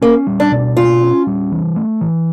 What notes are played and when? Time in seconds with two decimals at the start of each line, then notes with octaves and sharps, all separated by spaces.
0.02 A#3 C#4
0.27 G3
0.40 D4
0.52 B2
0.77 A#3 F4
1.01 C#4
1.27 G3
1.52 E3
1.76 A3
2.01 E3